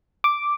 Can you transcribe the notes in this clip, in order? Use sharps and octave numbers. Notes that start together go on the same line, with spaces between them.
D6